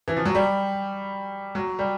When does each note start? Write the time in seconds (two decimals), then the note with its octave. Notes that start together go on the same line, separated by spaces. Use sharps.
0.08 E3
0.17 F3
0.25 F#3
0.35 G3
1.55 F#3
1.79 G3